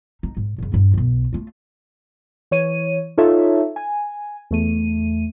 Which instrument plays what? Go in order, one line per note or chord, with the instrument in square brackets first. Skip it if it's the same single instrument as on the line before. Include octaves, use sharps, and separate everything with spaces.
[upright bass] D#4
G#2
F#2 C#3
G2 C4
B1 E2
A3 F4
[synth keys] E3 C#5 D#7
D#4 F4 A4 C#5 E5
G#5
E2 A3 D#7